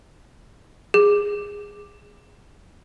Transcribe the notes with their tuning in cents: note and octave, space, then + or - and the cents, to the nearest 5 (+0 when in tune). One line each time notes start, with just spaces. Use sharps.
G#4 -15